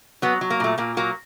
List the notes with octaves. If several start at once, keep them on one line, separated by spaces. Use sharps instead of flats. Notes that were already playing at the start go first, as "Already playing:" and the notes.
F#3 B3
F#3
A#3
A#2 A3
A#2 A#3
F#3 A#3